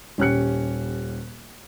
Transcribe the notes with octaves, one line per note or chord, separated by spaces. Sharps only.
D#1 C#4 G4 F#6 C#7